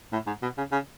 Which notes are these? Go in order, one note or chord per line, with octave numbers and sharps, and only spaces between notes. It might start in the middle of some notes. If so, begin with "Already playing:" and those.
A2
G#2
B2
C#3
C#3